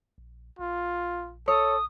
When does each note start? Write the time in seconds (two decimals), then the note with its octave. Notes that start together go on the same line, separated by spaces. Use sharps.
0.18 A#1
0.59 A#1 F4
1.48 A4 C#5 D#6